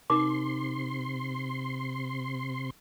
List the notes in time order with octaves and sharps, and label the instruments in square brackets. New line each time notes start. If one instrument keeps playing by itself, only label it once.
[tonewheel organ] C3 C6 [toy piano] D#4 A#4 D6